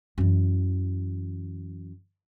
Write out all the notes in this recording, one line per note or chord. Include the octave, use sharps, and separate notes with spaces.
F#2 E3